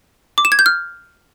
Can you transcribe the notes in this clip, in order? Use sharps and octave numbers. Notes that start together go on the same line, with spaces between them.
D6
E7
G#6
G6
F6